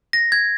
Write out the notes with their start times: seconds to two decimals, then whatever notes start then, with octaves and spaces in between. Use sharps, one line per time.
0.13 A#6
0.32 G#6